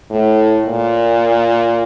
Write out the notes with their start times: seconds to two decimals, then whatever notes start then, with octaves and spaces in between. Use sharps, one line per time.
0.11 A2
0.65 A#2